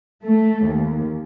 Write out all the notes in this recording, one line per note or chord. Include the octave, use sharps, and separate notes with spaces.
A3
D#2